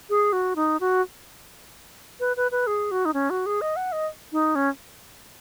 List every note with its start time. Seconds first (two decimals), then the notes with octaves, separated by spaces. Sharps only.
0.10 G#4
0.33 F#4
0.56 D#4
0.80 F#4
2.20 B4
2.37 B4
2.51 B4
2.67 G#4
2.91 F#4
3.05 D#4
3.14 C#4
3.30 F#4
3.46 G#4
3.61 D#5
3.76 F#5
3.92 D#5
4.32 D#4
4.55 C#4